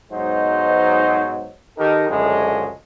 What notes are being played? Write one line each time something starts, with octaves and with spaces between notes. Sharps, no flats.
B1 G#2 F#3 G#3 D#4 C5
D#3 D#4 G4 A4 A#4
C#2 F#2 A2 D3 F3 G#3